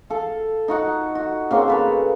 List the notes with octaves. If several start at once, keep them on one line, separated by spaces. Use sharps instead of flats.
A4 F5
D#4 F#4 F#5
F#4
C#3 A#3 C4
A4 B4 C#5